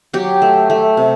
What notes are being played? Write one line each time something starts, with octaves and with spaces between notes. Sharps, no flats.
F#3 G4
A3
A3
C3